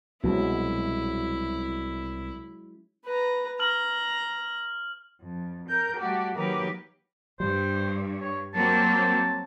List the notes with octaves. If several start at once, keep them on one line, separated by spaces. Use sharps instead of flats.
C2 B2 F#3 G#3 C#4 E4
B4 A#5
A#5 F6 F#7
F2
A#4 G6
G3 A3 F#4 G4
D#3 F#3 A#3 G4 A#4 B4
G2 G3 C5
C#5
F#3 A#3 C4 A5